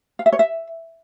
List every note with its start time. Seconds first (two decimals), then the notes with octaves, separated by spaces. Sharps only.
0.19 F5
0.26 E5
0.33 C#5
0.39 E5